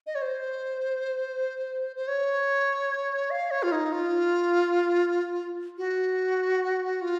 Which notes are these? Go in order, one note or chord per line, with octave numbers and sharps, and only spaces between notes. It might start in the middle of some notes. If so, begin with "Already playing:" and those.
D#5
C#5
C5
C5
C#5
F5
C#5
F4
D#4
F4
F#4
F4